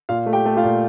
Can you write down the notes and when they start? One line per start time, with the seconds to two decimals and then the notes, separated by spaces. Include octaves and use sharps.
0.09 A#2 F4 F5
0.26 A3
0.33 G4 G5
0.46 A3
0.57 F4 F5
0.64 A#2